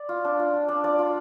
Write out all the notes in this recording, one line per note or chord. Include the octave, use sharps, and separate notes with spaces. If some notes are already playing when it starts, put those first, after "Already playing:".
Already playing: D5
F4
D4
F4
F4
D4
F4 D5
F4